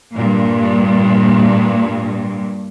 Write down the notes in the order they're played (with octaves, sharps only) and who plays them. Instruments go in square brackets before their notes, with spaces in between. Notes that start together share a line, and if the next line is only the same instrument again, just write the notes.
[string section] G2 A#2